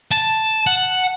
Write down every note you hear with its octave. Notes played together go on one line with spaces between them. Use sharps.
A5
F#5